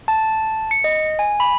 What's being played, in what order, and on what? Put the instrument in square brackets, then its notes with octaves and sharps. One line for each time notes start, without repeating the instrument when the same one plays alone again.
[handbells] A5
C#7
D#5
G#5
B5